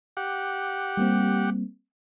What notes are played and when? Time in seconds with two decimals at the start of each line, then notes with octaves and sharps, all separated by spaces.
0.17 G4 F#5
0.97 G3 A#3 C4